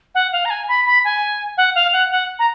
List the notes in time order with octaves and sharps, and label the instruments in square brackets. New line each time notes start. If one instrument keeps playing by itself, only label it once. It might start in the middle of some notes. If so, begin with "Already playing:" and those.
[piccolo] F#5
F5
A#5
G#5
B5
B5
G#5
F#5
F5
F#5
F#5
A#5